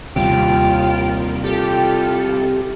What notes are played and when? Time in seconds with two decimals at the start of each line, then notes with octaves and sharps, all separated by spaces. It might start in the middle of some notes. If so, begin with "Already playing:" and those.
0.16 D#2 C3 G3 F4 G4
1.44 F4 G4 A4